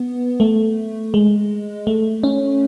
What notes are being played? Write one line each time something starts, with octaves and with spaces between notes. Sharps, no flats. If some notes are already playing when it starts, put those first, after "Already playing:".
Already playing: B3
A3
G#3
A3
C#4